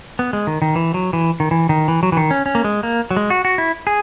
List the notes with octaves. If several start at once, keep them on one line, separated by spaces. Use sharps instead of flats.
B3
G#3
D#3
D#3
E3
F#3
E3
D#3
E3
D#3
E3
F#3
E3
D#3
C#4
C#4
A#3
G#3
A#3
F#3
G#3
F#4
F#4
E4
G#4